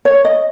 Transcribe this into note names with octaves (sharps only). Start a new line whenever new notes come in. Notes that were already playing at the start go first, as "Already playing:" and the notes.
C#5
D#5